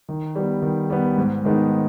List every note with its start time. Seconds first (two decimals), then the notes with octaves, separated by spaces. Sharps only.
0.09 D#3
0.35 G3 B3
0.62 D#3
0.90 G3 B3
1.17 G#2
1.45 D#3 G#3 B3 D#4